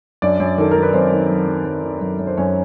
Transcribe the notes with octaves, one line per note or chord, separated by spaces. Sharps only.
F#2 D4 D5
F#2
D#3 A4
D#3 A#4
B4
F#2 C4 C5
D#3
F#3
F#3
F#2
D#3
F#2
F#2
C5
F#2 C#4 C#5